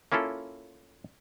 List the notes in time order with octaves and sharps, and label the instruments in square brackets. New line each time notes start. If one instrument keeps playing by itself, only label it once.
[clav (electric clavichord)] A#3 C#4 E4 F4 A4